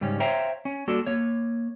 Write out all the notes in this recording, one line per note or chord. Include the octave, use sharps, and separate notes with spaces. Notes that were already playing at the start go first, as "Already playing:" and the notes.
G#2 C#3 G3 C#4
C5 C#5 E5 F5 G5 A#5
C#4
G3 A#3 D4 F#4 A4
A#3 C#5